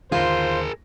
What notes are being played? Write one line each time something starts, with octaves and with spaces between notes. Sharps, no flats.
D#2 D3 D#3 F4 G#4 A#4 C5